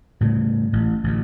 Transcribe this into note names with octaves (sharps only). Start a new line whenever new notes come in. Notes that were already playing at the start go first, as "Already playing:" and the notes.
A2 C#3 G3
A1
A1 D2